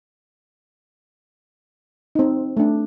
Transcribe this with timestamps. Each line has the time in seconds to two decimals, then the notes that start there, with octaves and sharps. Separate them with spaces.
2.15 C4 D#4
2.57 A3 D4